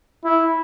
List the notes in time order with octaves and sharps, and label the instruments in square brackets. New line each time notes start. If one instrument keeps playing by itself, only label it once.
[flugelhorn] E4